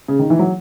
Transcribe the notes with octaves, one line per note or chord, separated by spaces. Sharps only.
C#3
D#3
E3
F#3